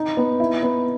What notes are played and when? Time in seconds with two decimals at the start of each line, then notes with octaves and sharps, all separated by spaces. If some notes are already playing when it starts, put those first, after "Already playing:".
Already playing: D#4
0.17 B3
0.40 E4
0.63 B3